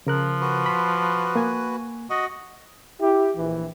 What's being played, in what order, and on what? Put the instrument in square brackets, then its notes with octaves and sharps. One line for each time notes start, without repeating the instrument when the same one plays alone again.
[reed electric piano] C#3 A#4 F#6 [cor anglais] F3
[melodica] F#4 B4
[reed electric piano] B5 C6
A#3 G#5
[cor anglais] F#4 [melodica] D#5
[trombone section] E4 G4
A#1 E3